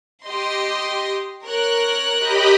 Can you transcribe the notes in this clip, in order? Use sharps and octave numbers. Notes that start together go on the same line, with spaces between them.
G4 D#5 C6
A#4 C#5 F#6
G4 D#5 B5